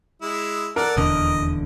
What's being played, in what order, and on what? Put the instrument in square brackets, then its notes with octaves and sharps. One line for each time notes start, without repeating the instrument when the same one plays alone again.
[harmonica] G#3 E4
[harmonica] A4 D5 F#5 [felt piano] A#4
[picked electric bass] D#1 E2 D3 [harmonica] D#5